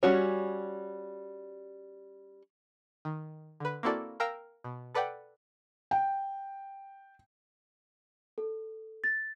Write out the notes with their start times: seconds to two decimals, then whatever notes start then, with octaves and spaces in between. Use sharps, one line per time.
0.03 G3 C#4 F#4 C#5
3.05 D#3
3.60 D3 B4
3.83 A#3 C4 E4 F#4 A4 D5
4.20 A#4 F5 G5 A#5 E6 A#6
4.64 B2
4.94 A4 B4 D5 F#5 G5
5.91 G5
8.38 A4
9.04 A6